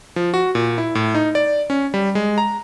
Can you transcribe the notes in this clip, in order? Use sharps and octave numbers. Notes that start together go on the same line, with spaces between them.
F3
F#4
A#2
E4
A2
D#4
D5
C#4
G3
G#3
A#5